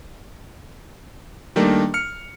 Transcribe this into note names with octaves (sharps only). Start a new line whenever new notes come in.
D#3 G3 A3 A#3 D4
F6 C#7